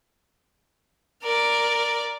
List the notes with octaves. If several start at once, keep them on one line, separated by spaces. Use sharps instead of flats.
A#4 D5